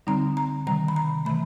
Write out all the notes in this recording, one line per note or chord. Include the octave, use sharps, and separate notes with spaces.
D3 G3 C4 D#4 A#5
A#5
C3 D#3 G3 A#5
B5
A#5
C3 E3 A3 B5